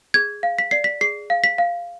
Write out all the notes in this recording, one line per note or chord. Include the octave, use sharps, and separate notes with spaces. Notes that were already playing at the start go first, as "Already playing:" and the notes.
G#4 G#6
F5
B6
D5 C7
B6
G#4 C7
F5
B6
F5